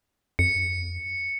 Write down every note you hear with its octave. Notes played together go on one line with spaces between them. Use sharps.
F2 C#7